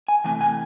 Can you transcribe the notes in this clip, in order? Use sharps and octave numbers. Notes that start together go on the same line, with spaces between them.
G#5
C3 E3 A3 G#5
G#5